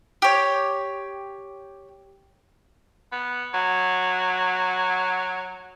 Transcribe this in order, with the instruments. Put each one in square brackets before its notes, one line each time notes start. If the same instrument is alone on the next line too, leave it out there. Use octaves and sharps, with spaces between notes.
[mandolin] G4 C#5
[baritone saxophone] B3
F#3